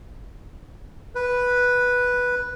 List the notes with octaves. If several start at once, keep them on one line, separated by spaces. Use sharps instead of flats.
B4